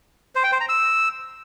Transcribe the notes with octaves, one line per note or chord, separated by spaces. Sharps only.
C5
G5
C5
A#5
E6